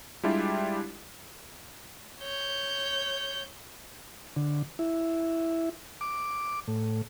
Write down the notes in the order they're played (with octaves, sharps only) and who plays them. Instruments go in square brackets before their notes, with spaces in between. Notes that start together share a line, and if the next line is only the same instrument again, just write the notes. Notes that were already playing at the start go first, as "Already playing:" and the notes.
[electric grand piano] G3 G#3 D4 E4 F4 G4
[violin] C#5 G6
[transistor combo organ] D3
E4
D6
A2